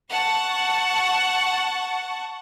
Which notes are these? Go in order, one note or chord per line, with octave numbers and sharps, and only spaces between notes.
F#5 A5 C#6